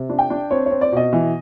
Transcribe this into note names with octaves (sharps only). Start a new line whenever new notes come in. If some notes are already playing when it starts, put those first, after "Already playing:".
Already playing: C3
D4
G5
D4
C4 C#5
C4 C#5
D5
B2 D#5
E3